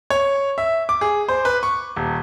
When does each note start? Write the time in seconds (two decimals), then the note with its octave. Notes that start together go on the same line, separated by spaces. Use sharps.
0.10 C#5
0.58 E5
0.89 D6
1.01 G#4
1.28 C5
1.45 B4
1.63 C#6
1.96 D#1